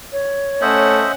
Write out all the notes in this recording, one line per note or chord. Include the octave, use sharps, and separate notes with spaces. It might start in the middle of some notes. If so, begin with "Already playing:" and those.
C#5
A3 C#4 C5 D#5 E5 F#5